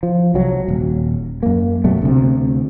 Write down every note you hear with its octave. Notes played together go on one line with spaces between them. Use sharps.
F3
C2 F#3
D#1
F#2 A#3
B2 F#3 G3 A3
D2 C3